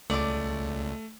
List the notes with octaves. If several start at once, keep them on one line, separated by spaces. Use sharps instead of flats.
C#2 A3 D5 D6